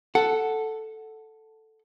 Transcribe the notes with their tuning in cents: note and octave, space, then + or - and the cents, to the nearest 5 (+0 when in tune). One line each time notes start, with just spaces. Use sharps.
A4 +0 F#5 +0